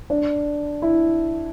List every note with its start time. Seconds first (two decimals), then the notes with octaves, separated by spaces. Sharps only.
0.10 D4
0.82 E4